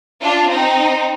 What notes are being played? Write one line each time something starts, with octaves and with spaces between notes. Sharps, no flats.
D4 F4
C4 D#4